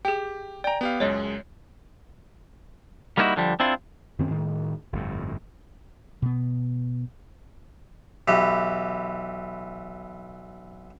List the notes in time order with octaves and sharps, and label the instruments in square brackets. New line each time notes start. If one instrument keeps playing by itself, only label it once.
[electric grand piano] G4 [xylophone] G#4 G5
[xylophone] D5 G#5 [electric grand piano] G5 A#5
[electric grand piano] B3 G4 F5
[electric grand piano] C#2 F#2 G#3 [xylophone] C#5 D#5
[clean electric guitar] G3 A#3 B3 D#4 E4 F#4
D3 F3 G3
C4 D4 E4 F4
[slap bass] F#2 D#3 C4 C#4
A2 D#3
G1 F2 A2
[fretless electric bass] B2 B3
[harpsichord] B1 E3 G4